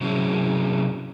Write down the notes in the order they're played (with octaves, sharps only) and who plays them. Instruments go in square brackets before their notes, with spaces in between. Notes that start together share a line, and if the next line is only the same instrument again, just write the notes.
[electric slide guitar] C3 F#3 C#4 E4 G#4